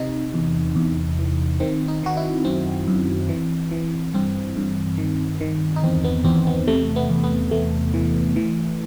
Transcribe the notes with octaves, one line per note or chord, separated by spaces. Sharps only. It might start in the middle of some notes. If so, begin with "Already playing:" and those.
Already playing: C3 D#4
E2
E2
E3
D#3 C4
D#4
D#3 F#4
E4
F#2 C4
F#2
E3
E3
G2 C4
G2
D#3
D#3
D#4
E2 C4
B3
E2 C4
B3
C3 A3
B3
E2
B3
E2 A3
E3
E3